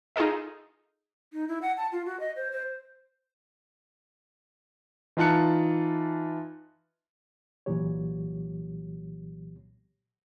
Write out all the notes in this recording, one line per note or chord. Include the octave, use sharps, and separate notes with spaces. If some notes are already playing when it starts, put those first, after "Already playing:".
D#4 F4 G#4 A4 D#5
D#4
E4
F#5
A5
F4
F#4
D#5
C5
C5
E3 D#4 F4 A5 F#6 C#7
C2 A#2 E3 F#3 G4 C#5